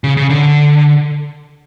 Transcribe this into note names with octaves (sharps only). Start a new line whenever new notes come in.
C#3
C#3
D3